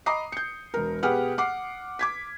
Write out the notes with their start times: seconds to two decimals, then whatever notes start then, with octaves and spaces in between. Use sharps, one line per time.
0.06 D#5 A#5 B5 D6 D#6 C7
0.32 G6 C#7
0.74 E1 A#4
1.03 B2 G4 G#4 B4 F#5 F6
1.38 F#5 D6 C7
1.99 D6 G#6 B6